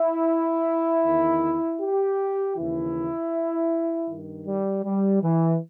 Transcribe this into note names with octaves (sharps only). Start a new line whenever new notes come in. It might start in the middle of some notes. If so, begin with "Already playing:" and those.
Already playing: E4
E2 D#3
G4
D#2 C#3 E3 E4
G2 D#3
G3
G3
E3